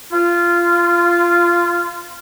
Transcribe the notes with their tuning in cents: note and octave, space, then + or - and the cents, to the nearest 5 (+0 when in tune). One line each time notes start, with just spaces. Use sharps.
F4 -15